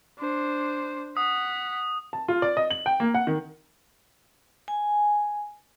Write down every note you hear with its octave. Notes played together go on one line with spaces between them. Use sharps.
D4 C5
F#5 D#6 B6
A5
F4
D5
D#5
F#7
G5
A#3
F#5
D#3
G#5